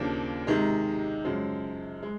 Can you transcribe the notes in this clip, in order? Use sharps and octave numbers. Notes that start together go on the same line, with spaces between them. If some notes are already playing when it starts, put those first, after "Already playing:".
Already playing: D#2 C#3 F3 A#3 D4
C3 D#3 G#3
F#2 C#3 F3 G#3
G#3